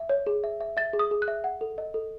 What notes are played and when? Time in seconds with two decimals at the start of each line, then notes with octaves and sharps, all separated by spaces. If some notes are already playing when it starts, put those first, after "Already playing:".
Already playing: E5
0.09 C#5
0.27 G#4
0.44 E5
0.61 E5
0.77 E5 A6
0.93 G#4
0.99 D#6
1.11 G#4
1.22 F#6
1.28 E5
1.44 F#5
1.61 A4
1.78 D#5
1.94 A4